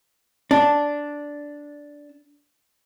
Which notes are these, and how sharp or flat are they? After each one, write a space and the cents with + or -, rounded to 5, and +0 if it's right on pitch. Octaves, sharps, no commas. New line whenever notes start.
D4 -5